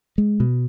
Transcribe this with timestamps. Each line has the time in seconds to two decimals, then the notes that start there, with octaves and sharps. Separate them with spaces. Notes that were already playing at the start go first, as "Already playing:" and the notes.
0.18 G#3
0.40 B2